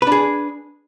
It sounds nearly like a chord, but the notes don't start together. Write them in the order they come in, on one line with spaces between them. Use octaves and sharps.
B4 D4 G#4